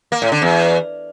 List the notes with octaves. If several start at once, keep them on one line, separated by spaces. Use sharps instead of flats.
A#3
A2
D3
E2